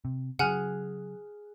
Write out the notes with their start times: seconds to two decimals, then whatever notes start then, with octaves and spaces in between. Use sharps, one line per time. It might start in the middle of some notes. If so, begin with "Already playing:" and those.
0.05 C3
0.39 C#3 F#3 G#4 F#5 G#5 F6 F#6